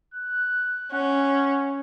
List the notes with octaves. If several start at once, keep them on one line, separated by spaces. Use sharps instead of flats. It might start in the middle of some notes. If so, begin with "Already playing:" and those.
F#6
C#4 F#5